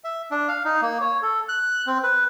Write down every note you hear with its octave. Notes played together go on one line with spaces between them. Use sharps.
E5
D4
F5
D#4
A#3
C#5
A4
F#6
C4
B4